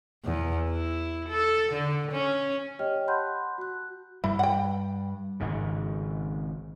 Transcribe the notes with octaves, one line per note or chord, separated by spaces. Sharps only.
E2
E4
A4
D3
C#4
G4 C#5 D#5 G5 F6
F#5 A5 B5 C6 F#6 G6
F#4 F#6
G2 G3 E4
F#5 G5
G#1 G#2 C#3